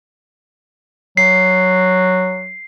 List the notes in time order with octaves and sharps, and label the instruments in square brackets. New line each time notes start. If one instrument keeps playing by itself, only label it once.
[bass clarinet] F#3 [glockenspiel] C7